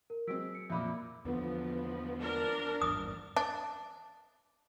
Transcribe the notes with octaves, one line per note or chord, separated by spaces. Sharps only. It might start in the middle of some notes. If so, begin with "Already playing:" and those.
A#4
F#3 G#3 C4 E6 B6 D7
C#7
F2 A#2 E5 B5 D6
E2 D3 F3 B3
D4 A#4
G#1 E2 G2 D#6
D4